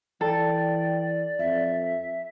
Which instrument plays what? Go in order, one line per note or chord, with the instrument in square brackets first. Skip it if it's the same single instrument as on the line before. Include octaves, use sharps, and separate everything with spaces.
[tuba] E3 [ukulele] A4 [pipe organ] D5 [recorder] G5
[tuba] F2 [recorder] E5